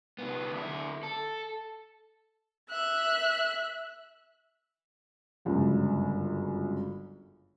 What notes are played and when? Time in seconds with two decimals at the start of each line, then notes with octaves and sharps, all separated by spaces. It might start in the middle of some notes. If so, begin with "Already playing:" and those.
0.19 C2 B3
0.52 D2 E4
1.03 A4
2.70 E5 F#6
5.45 G1 C#2 F#2